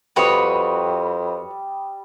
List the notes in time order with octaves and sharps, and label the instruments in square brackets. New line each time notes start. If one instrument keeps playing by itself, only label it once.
[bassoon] F2 [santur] G3 D6 D#6 [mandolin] F#4 B4 C#5